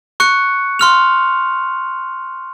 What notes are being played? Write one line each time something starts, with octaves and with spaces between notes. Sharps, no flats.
C#6 F#6 C#7
C6 F6 F7